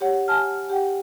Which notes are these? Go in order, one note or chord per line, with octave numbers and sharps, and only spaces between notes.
G4 C#5 F#5
G#5 A5 F6
G4 F#5 G5